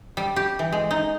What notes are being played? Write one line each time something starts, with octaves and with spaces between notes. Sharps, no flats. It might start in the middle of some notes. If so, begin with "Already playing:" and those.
G3
G4
E3
G#3
D#4